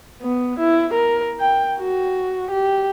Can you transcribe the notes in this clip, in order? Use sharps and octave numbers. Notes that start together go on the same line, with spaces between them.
B3
E4
A#4
G5
F#4
G4